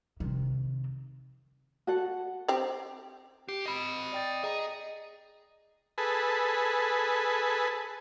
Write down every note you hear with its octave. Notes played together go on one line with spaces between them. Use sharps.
C3 D#3
F#4 A4 F#5
C4 G4
G4 C7
D#5 B5
D5 G5 A6
G#4 D#5 A#5
G#4 A4 B4